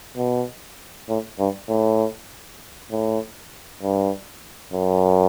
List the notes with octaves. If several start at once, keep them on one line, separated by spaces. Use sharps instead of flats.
B2
A2
G2
A2
A2
G2
F#2